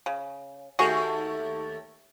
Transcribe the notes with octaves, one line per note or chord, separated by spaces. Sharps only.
C#3
D#2 A3 F#4 G#4 C#6